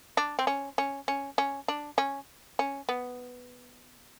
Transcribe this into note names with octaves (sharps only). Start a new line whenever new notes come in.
D4
C4
C#4
C#4
C#4
C#4
D4
C#4
C#4
B3